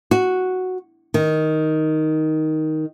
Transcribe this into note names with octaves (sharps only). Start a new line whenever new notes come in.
F#4
D#3